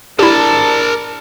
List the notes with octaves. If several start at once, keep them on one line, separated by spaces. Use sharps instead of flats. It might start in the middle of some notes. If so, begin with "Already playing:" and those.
D4 E4 G4 A#4 A5